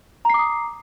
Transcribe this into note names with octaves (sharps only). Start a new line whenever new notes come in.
A#5 D6 D#6 C7